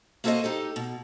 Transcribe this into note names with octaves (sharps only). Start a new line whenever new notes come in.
A#3 F#4 A4 B4 C5 D#5
D#4 G4 A4
B2